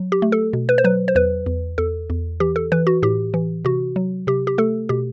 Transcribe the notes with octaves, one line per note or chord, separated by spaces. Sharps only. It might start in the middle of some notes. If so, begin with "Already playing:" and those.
Already playing: F#3
G4
A3
A4
B2
B4
C5
F#3 B4
C5
E2 B4
E2
E2 A4
E2
E3 G4
A4
E3 B4
F#4
A2 G4
E3
C3 F#4
F#3
C3 G4
G4
A3 A4
B2 G4